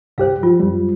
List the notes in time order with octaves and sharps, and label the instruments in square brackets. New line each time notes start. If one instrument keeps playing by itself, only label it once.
[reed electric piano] C2 G2 G4 [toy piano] C5 F5
[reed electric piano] F3 [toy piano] F4
[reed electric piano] F#2 G3